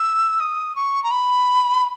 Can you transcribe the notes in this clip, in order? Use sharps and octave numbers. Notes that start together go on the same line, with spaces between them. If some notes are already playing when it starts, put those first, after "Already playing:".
Already playing: E6
D#6
C#6
A#5
B5